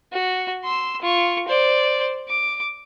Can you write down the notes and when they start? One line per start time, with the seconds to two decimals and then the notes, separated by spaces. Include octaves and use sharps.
0.13 F#4
0.64 C6 E6
1.02 F4 C#6
1.48 C5 D5
2.28 D6